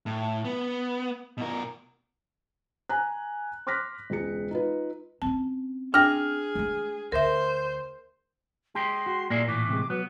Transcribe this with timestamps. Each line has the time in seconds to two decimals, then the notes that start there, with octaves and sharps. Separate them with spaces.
0.06 A2
0.45 B3
1.38 B2 A#4
2.89 G#5 A#5 F#6
3.67 C6 D6 F6 F#6 A#6 B6
4.10 E1 C#2 G#4 C#7
4.51 D#4 F4 B4
5.22 C4 C#4 A5
5.94 D4 G#4 G5 F6 A#6
6.55 G#3 A3
7.12 D2 A#4 C5 E5
8.75 G#3 G4 C6
9.06 F#4
9.30 A#2 A#3 E4 G#4 D5
9.48 A2 E3 D6
9.69 C3 G#3
9.90 F#3 B3 B4